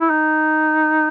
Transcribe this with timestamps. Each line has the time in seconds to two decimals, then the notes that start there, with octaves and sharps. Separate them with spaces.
0.01 E4
0.10 D#4